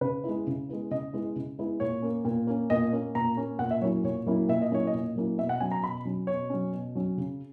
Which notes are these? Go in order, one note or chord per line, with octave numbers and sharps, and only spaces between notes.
C#3 B4
G#3 B3 E4
C#3
G#3 B3 E4
C#3 D#5
G#3 B3 E4
C#3
G#3 B3 E4
A#2 C#5
A#3 C#4
A#2
A#3 C#4
A#2 D#5
A#3 C#4
A#2 A#5
A#3 C#4
A#2 F#5
E5
F#3 A#3 C#4 E4 C#5
A#2 C#5
F#3 A#3 C#4 E4
A#2 E5
D#5
F#3 A#3 C#4 E4 C#5
D#5
A#2
F#3 A#3 C#4 E4
B2 E5
F#5
F#3 C#4 G#5
A#5
B2 B5
F#3 C#4
B2 C#5
F#3 C#4
B2
F#3 C#4
C#3